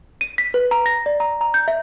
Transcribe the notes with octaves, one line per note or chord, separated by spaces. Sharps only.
D#7
B6
B4
A#5
A#6
D5
A#5
A#5
G6
E5